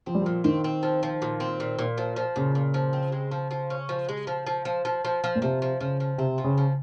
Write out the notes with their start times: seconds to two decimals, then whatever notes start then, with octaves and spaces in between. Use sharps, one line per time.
0.06 F3 C4
0.15 G3
0.22 A#2 F3
0.44 D#3 C4
0.64 C4
0.83 F3
1.03 F3
1.22 A#2
1.40 C4
1.60 A#2
1.79 A#2
1.98 F3
2.16 F3
2.36 A#2 C#3
2.55 A#2
2.74 F3
2.93 C4
3.12 G#3
3.31 F3
3.51 F3
3.70 C#4
3.89 F3
4.09 G#3
4.27 F3
4.47 F3
4.65 F3
4.85 F3
5.05 F3
5.24 F3
5.35 A#2
5.42 C3 F3
5.62 F3
5.81 C#3 F3
6.00 F3
6.18 C3 C4
6.38 F3
6.44 C#3
6.58 F3